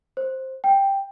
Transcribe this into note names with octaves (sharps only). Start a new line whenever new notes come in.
C5
G5